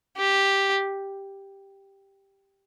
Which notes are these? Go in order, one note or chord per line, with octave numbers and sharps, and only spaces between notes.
G4